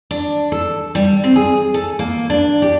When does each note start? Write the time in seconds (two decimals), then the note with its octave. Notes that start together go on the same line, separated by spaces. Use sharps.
0.11 D4
0.52 A4
0.95 G3
1.24 C4
1.36 G#4
1.74 A4
1.99 A#3
2.30 D4
2.62 G4